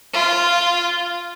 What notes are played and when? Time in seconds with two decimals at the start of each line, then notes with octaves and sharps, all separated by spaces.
0.13 F4